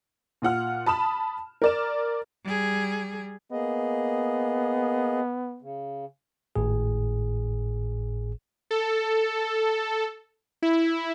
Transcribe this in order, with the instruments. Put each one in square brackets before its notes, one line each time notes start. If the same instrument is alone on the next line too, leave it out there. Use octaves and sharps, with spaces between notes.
[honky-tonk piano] A#2 F4 F#5 F6
A5 B5 D#6 E7
A#4 D5 E7
[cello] G3 G#4
[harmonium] A#3 G#4 D#5 [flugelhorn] B3
[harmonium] C#3
[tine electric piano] G#1 A2 G#4
[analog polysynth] A4
E4